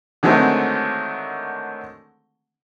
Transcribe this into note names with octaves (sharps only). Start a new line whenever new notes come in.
D3 D#3 F#3 G#3 A3 C4